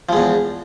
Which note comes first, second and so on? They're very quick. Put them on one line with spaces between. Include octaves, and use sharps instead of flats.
F3 G#3 E2